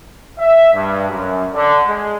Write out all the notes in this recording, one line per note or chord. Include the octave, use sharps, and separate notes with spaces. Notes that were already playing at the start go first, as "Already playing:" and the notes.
E5
G2
F#2
D3
G#3